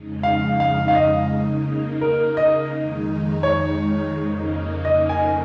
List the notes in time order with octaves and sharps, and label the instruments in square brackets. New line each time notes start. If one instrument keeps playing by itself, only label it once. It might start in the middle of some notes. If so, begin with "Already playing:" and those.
Already playing: [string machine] F2 C#3 G#3 D#4
[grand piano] F5
F5
F5
D#5
[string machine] C#3 A#3 D#4
[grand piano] A#4
D#5
[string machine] F2 D#3 G#3 D#4
[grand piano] C#5
[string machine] F2 C#3 A#3 D#4
[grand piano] D#5
G#5